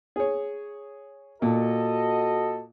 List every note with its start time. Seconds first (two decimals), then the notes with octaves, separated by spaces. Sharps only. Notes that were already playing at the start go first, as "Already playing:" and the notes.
0.16 G#4 C#5
1.42 A#2 F#4 A4 D#5